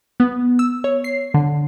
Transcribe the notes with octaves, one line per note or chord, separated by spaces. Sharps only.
B3
E6
C#5
C7
D3